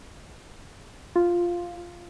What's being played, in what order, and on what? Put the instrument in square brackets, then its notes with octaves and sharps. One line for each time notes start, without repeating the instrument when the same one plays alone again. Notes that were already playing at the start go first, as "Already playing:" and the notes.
[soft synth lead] F4